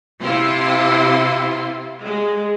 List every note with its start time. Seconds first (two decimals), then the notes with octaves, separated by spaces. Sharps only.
0.22 C3 E4 F4 C6
2.01 G#3